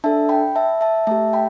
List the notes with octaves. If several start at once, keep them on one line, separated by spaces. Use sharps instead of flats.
D4 A4 E5 A5
G5 B5
E5 A5
E5 A5
A3 G4 E5 A5
G5 B5